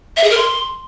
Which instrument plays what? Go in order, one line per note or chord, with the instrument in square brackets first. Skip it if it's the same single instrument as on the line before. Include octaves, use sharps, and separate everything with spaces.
[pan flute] E5
G#4
A#4
C6